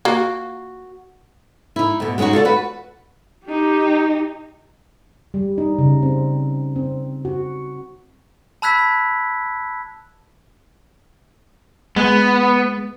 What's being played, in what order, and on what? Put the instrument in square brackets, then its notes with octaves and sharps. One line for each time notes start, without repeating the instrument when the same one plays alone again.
[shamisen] A#3 [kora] F#4
[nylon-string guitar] D#4 E4
D2 B2
G#3 B3 C#4 D#4 F#4
F4 A4 C#5 D5
F#4 B4
[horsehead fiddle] D#4 G4
[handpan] G3
D#4
C#3
C4
C4
F#4
[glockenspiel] A5 B5 E6 F#6 G#6 B6
[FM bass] G#3 [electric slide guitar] B3